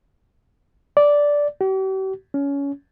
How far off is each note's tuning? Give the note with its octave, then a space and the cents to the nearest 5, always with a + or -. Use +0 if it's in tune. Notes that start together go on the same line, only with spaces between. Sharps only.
D5 -10
G4 -45
C#4 +20